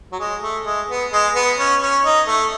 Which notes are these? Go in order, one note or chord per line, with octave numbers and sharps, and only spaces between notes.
F#3
G#3
A3
G#3
B3
G#3
B3
C#4
C#4
D#4
A3